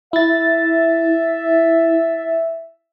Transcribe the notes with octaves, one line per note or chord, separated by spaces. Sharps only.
E4 E5 A6